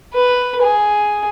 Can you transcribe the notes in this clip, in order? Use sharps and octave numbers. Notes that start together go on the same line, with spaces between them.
B4
G#4